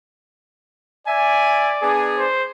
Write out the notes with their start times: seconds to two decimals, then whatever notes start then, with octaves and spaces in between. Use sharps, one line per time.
1.07 D5 E5 G#5
1.83 B3 D4 G#4
2.18 C5